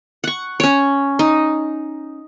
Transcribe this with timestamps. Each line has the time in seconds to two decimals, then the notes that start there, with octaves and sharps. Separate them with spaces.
0.24 F#5 C#6
0.60 C#4 C#5
1.19 D#4